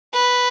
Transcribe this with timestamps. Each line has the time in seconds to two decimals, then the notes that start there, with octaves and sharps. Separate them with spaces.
0.13 B4